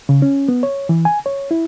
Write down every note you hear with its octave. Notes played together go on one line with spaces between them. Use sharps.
C#3
C#4
B3
C#5
E3
G#5
C#5
E4